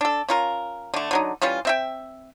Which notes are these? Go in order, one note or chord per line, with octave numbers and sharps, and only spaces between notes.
D4 A4
C#4 F4 A#4
D3 A3
D3 F#3 D#4
E3 G3 C#4 F4
C4 E5 G5